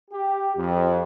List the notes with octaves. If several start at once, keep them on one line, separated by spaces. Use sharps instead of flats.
G4
F2